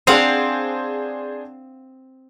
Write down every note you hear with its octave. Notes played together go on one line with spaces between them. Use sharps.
C4 D4 G#4 C5 F5 F#5